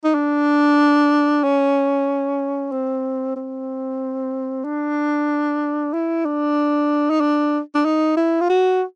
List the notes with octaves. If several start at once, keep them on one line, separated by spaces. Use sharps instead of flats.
D#4
D4
C#4
C4
C4
D4
E4
D4
D#4
D4
D4
D#4
E4
F4
F#4